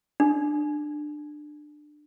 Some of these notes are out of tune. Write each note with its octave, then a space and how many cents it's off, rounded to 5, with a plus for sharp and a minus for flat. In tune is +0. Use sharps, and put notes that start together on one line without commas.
D4 +20